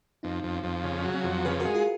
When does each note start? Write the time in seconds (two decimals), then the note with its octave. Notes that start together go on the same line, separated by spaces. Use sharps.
0.23 F2 B3 D#4
0.44 F2
0.53 C#4
0.64 F2
0.84 C#3 C#4
1.04 F#3
1.14 C#4
1.24 F2
1.45 C#3 G#4 B4
1.60 G#3 F#4 A#4
1.74 F4 G#4